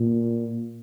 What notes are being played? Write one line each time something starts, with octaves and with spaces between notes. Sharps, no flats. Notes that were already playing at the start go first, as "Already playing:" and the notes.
Already playing: A#2